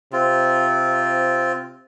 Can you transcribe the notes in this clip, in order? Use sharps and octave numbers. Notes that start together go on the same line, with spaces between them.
C3 C4 F4